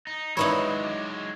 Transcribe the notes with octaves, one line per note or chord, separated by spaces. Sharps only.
D#4
G#1 F#3 G#3 D#4 E4 B4 C#5 B5
D6